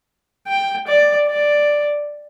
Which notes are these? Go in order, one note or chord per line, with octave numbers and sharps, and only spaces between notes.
G5
D5
D5